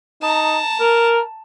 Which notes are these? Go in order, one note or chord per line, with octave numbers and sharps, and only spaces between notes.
D#4 A5 A#5
A#4